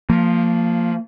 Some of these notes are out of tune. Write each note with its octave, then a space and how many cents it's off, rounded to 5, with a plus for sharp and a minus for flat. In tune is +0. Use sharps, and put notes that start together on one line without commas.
F3 +0 A#3 -25